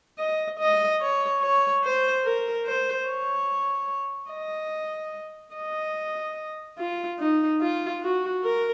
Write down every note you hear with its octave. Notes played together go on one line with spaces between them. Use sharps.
D#5
D#5
C#5
C#5
C5
A#4
C5
C#5
D#5
D#5
F4
D#4
F4
F#4
A#4